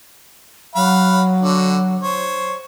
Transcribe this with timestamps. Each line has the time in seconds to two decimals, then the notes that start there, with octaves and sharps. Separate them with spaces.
0.75 F#3 F5 F#5 B5
1.41 D3 F#4
2.03 C5 C#5